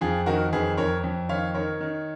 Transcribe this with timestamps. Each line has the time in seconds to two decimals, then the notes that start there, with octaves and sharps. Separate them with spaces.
0.01 F2 F4 G#4
0.26 D#3 F#4 A#4
0.53 F2 G#4 B4
0.77 F2 A#4 C#5
1.04 F2
1.29 D#3 C#5 F5
1.54 D#3 A#4 C#5
1.81 D#3